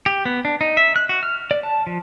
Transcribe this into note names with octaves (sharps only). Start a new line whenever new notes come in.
G4
B3
D4
D#4
E5
F#6
F#4
F6
D5
A5
F3